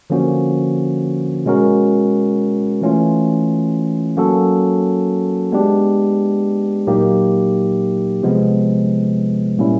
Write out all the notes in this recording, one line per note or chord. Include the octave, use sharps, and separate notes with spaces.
D3 F3 A#3 C#4 F#4
B2 G#3 C#4 F#4 A#4
E3 A3 C#4 F4
F#3 A#3 C#4 F#4 A4
G#3 B3 D4 G4
A#2 F#3 A#3 D#4 G4
C3 F3 G#3 B3
A#2 G3 A#3 C#4 E4